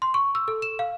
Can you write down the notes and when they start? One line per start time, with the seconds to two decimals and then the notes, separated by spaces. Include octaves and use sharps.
0.02 C6
0.14 C#6
0.35 E6
0.48 A4
0.62 E7
0.79 F5